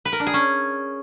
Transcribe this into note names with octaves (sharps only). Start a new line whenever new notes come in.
B4
A#4
D4
G#4
C#4